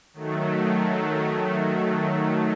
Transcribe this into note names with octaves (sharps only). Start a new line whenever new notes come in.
D#3 F#3 A3